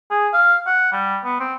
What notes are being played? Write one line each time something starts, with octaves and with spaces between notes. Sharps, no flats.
G#4
F5
F#5
G3
B3
C4